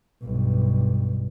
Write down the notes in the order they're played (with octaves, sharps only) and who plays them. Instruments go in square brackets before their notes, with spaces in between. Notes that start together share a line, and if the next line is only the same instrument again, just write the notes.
[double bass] B1 G2